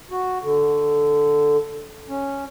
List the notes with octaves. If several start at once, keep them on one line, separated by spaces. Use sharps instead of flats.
F#4
D3
C#4